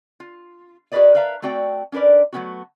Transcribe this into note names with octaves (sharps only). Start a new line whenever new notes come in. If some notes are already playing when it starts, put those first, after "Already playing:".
F4
F#4 G#4 A#4 B4 D5 D#5
A#4 B4 E5 F5 A5 A#5
A3 C4 F#4 D5 G5
C#4 D4 A#4 B4 D5
F#3 A3 B3 C#4 D#4 F#4